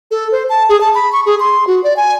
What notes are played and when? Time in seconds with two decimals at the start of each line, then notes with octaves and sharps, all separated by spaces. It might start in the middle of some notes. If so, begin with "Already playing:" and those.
0.11 A4
0.32 C5
0.49 A5
0.69 G#4
0.81 A5
0.95 B5
1.13 C#6
1.26 G#4
1.40 C6
1.67 F#4
1.84 D5
1.97 G#5